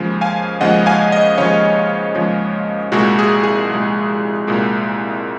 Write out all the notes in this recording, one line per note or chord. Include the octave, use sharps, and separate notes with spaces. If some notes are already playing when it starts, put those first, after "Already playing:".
Already playing: D#2 C#3 F3 G#3
F5 G#5
D#2 C#3 F3 G#3 D#5 F#5
F5 G#5
D#5 F#5
D#2 C#3 F3 G#3 C#5 F5
D#2 C#3 F3 G#3
C2 A#2 G#3 F#4
G#4
G#4
C2 A#2 G#3
C2 A#2 G#3